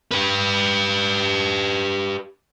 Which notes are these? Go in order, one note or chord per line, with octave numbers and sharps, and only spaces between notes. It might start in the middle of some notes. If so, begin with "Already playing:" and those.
G4 B4